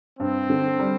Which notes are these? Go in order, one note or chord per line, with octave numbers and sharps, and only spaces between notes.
G2 C4
D3
G3